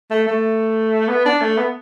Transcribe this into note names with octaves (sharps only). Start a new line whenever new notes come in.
A3
A3
B3
D4
A3
B3